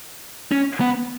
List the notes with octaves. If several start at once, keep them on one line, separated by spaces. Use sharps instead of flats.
C#4
B3